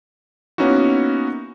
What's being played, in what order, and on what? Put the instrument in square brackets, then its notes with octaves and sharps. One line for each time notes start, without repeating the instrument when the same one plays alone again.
[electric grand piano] A#3 B3 C#4 D#4 E4 F#4